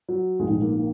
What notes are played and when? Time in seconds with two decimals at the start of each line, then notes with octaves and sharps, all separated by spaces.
0.09 F#3
0.40 A#1 G#2 D#3 G#3
0.50 G#3
0.62 A#3
0.72 A#3